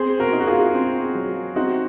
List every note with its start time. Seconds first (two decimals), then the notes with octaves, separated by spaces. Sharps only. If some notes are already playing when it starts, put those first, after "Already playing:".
Already playing: C4 G#4 C5
0.19 F#4 A#4
0.33 D#4
0.40 F#4
0.47 F4 G#4
0.75 C4
1.15 F#3
1.56 C4 D#4 F#4